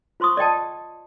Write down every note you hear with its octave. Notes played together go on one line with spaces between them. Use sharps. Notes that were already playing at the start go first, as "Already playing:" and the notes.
F4 C5 C6 C#6 D#6
D5 D#5 G5 A5